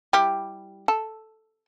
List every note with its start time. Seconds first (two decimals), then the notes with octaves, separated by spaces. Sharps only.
0.13 G3 E4 G4
0.88 A4